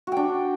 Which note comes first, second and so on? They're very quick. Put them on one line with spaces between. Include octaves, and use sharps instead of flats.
F#4 G5 D4